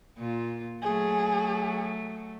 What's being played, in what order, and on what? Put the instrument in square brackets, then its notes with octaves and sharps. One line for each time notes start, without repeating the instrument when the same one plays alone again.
[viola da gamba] A#2 F4
[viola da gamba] F#3 A3 [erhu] G#4